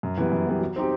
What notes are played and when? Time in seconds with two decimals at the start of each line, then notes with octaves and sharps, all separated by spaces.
0.03 F#2
0.17 E3 G3 B3
0.32 F#2
0.47 E3 G3 B3
0.60 F#3
0.76 C4 D#4 G4